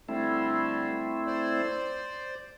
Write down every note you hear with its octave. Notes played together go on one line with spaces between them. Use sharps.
D3 G3 A3 C4 E4
C5 D5